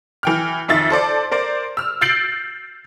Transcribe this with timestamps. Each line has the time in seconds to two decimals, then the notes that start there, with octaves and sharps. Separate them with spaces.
0.23 E3 G5 F6
0.68 F2 D#3 E5 A6
0.90 A4 C5 D5
1.31 A#4 C5 D5
1.77 E6 F6
2.01 E6 G6 A6 C7 D7 F#7